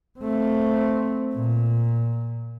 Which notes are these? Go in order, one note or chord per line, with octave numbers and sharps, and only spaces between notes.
A3 C4
A#2